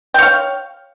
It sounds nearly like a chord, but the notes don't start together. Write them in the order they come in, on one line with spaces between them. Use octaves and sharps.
G5 C#5 F5